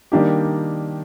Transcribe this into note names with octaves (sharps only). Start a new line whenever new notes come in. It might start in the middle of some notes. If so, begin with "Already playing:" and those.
D#3 G3 A#3 D4 G4